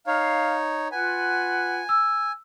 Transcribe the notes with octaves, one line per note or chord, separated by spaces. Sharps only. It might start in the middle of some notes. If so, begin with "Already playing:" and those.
D#4 C#5 F5
F4 B4 F#5 G#5
E6